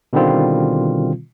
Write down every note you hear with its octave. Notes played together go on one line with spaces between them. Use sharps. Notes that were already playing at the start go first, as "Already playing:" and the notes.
B2 D3 D#3 G3 C4 F4